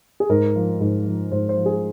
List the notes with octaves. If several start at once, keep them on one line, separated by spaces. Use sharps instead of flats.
G#4
G#2 A#4
F3
G#2
F3
G#2 C5
C5
F3
G#4